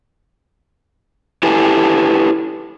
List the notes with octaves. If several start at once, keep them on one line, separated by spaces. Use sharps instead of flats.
E4 G4 A4 B4 G#5